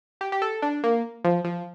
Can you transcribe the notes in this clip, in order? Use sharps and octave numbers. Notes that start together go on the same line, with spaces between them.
G4
G4
A4
D4
A#3
F3
F3